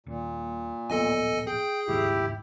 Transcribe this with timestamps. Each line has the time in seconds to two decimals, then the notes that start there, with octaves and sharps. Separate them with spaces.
0.06 D#1 A#2
0.90 D1 A#1 B3 A4 D#5 G#5
1.47 G#4 G5 G6
1.88 D#1 C#2 G#2 E4 G4